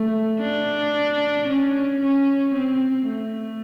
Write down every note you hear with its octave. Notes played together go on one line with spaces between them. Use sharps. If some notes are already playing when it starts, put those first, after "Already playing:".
Already playing: A3
D4
C#4
C#4
C4
A3